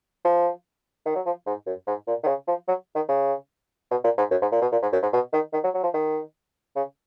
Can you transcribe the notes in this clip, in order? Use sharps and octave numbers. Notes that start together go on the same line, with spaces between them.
F3
D#3
F#3
F3
G#2
F#2
G#2
A#2
D#3
C#3
F3
F#3
D#3
C#3
B2
A#2
G#2
F#2
G#2
A#2
B2
A#2
G#2
F#2
G#2
B2
D#3
D#3
F#3
F#3
F3
D#3
C#3